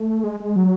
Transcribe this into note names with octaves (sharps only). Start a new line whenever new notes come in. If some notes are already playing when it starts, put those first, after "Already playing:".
Already playing: A3
G#3
G#3
F#3